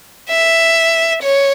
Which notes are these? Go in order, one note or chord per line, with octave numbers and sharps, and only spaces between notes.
E5
C#5